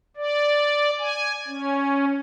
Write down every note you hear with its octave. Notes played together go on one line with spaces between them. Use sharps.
D5
G#5
C#4